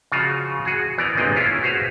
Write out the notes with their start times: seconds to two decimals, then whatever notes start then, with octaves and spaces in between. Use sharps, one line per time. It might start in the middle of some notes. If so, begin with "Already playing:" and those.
0.12 C#3 F3 F4 F#4
0.65 F#4 G#4
0.98 E3 B3 A#4 D5
1.16 G1 A#2 G#3 B3 C4 D#5
1.36 C#4 E4 F4
1.61 F#4 G#4 B4 C5 F5